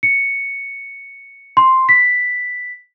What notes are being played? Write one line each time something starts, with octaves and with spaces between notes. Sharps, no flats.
C#7
C6
B6